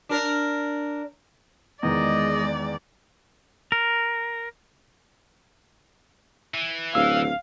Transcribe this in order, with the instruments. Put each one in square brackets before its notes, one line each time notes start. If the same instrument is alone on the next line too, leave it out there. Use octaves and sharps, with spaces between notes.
[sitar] D4 A#4
[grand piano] E2 D#3 [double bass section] G#3 [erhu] D5 [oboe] D#5
[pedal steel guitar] A#4
[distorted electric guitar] E3
[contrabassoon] D1 [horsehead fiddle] F5 [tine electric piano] E6